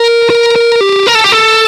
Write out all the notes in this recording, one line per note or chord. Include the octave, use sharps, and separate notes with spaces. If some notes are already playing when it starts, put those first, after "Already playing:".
Already playing: A#4
A#4
A#4
G4
A#4
A4
G4
A4